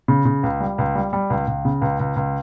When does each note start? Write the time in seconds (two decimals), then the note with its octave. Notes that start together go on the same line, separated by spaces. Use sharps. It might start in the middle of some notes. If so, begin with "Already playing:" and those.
0.08 C#3
0.25 C#3
0.43 C#2
0.61 G3
0.78 C#2
0.95 G3
1.13 G3
1.30 C#2
1.47 C#2
1.65 C#3
1.82 C#2
2.00 C#2
2.16 C#2